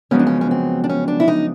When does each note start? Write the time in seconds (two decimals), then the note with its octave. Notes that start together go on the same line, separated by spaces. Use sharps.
0.11 F#2 C#3 F3 G#3 B3 C#4
0.19 D4
0.27 C#4
0.41 C#4
0.51 C4
0.84 D4
0.89 C#4
1.08 D4
1.20 E4
1.28 D#4